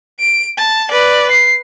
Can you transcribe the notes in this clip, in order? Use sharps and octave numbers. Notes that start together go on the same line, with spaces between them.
D7
A5
B4 D5
C7